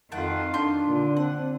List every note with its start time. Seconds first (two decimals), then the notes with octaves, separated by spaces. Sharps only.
0.12 F2 D#3 F4 F#5 G5 A5
0.54 D4 C6 G6
0.87 A#2 D3
1.17 C4 F#5